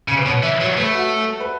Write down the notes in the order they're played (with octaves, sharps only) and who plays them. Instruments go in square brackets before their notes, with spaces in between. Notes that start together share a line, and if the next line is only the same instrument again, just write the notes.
[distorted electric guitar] C#3
[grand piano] B4
[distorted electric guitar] B2 [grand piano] C#5
[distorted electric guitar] E3 [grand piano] E5
[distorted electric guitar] F#3 [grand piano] C#5
[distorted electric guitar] A3 [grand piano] B4
[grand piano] F#4
A4
B4